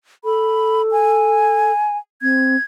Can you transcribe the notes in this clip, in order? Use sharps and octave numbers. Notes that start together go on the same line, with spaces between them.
A4 B5
G#5
C4 G#6